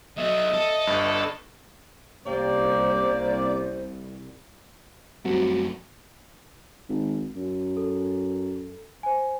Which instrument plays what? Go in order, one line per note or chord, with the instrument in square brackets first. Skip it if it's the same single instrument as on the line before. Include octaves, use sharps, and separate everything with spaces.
[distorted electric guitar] F#3 B3 [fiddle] D#5 [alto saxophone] E5
[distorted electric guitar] A4
[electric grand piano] G1 G2
[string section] C2 [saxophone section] A#3 D5 [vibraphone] C#4 G4 G5 [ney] C5
[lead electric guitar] F#2 A3 [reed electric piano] G3 C4 F#4
[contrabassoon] G#1
F#2
[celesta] A4
C5 G#5